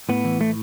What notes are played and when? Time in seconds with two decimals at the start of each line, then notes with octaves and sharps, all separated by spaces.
0.09 A2 B3
0.25 E3
0.41 A2 A3